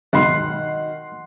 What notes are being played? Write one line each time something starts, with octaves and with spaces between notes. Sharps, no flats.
B1 G#2 D#3 F#3 F#5 B5 C6 F6